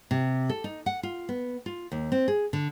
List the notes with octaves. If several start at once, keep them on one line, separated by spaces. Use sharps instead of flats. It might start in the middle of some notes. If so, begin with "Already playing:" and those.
C3
A4
D#4
F#5
F4
B3
F4
D#2
C4
G#4
D3